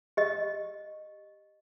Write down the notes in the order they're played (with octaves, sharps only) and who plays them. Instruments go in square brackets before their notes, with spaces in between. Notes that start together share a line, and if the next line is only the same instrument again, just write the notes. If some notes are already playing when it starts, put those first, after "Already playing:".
[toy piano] G4 D#5